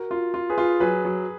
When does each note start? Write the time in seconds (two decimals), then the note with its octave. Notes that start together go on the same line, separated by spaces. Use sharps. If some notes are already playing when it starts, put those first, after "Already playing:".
Already playing: F#4 A#4
0.11 F4
0.34 F4
0.50 G#4 B4
0.58 F4
0.80 F#3 G#4 B4
1.04 F#3